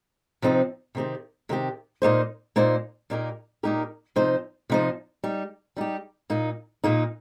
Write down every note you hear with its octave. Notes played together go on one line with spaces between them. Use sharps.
C3 F3 C4 D#4 C5
C3 D#3 C4 G4
C3 D#3 C4 G4
A#2 A#3 D#4 C5
A#2 A#3 D#4 C5
A#2 A#3 D#4 G4 A#4
A#2 A#3 D#4 G4 A#4
C3 F3 D#4 C5
C3 F3 D#4 C5
G3 D#4 G4
G3 D#4 G4
A#2 A#3 D#4
A#2 A#3 D#4